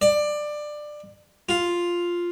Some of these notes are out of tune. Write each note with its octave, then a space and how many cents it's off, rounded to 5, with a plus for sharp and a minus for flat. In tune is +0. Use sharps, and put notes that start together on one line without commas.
D5 +20
F4 +0